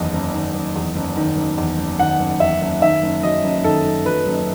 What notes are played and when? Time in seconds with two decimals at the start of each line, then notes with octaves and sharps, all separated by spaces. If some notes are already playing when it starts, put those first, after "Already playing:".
Already playing: F#1 E2 D#3 D#5
0.13 F#1
0.33 D#3
0.54 F#1
0.75 E2
0.96 F#1
1.17 D#3
1.37 F#1
1.58 E2
1.78 F#1
1.99 D#3 F#5
2.19 F#1
2.40 E2 E5
2.61 F#1
2.81 D#3 E5
3.02 F#1
3.23 F#2 D#5
3.44 F#1
3.64 D#3 A4
3.86 F#1
4.06 F#2 B4
4.26 F#1